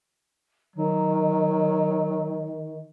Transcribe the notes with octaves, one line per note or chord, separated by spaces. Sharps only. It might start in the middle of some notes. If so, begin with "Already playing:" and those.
D#3 F#3